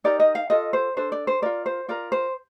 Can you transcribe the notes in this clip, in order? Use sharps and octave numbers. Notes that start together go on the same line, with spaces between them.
D#4 G4 A#4 D5
D#5
F5
F4 A4 D#5
C5
D4 A4 C5
D5
C5
F4 A#4 D5
C5
F4 A#4 D5
C5